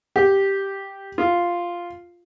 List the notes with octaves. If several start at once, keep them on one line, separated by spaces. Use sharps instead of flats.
G4
F4